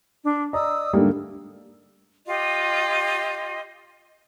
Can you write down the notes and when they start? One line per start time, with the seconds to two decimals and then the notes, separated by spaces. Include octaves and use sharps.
0.25 D4
0.53 D5 D#5 A#5 D#6 E6
0.93 G#2 D3 G3 A3 A#3
2.27 F4 G4 D#5